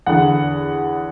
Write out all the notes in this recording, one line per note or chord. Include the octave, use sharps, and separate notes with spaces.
E2 D3 F#5